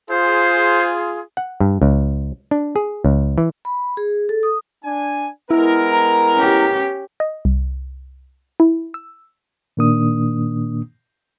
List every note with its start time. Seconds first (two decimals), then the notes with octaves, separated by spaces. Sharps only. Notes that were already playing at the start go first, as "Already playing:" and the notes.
0.11 F4 G#4 C5
1.37 F#5
1.60 G2
1.82 C#2
2.51 D4
2.76 G#4
3.04 C#2
3.38 E3
3.65 B5
3.97 G#4
4.29 A4
4.43 D#6
4.84 D4 G#5
5.51 G#3 B3 E4 A#4
5.92 A#5
6.36 C#4 G4
7.20 D#5
7.45 C2
8.60 E4
8.94 E6
9.77 A#2 D#3 A#3 D4 D#6